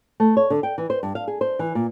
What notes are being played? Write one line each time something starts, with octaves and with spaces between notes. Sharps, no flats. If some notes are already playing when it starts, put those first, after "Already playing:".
A3
C#5
D3
G5
E3
C5
G2
F5
G#4
C5
E3
A#2